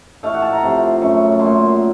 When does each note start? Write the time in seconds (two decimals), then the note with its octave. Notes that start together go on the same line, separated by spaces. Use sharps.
0.23 A2 A3 F5
0.33 F#5
0.42 A5
0.53 A#5
0.62 C3 F3 A3
1.01 F#2 C#3 F#3 A3
1.40 A#2 A3 C6